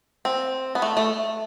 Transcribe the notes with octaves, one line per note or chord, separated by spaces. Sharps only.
C4
B3
A3
A3